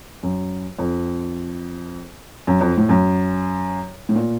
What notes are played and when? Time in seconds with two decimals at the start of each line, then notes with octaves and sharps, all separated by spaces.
0.23 F#2
0.79 F2
2.47 F#2
2.61 F2
2.77 A2
2.89 F#2
4.09 A2
4.16 A#2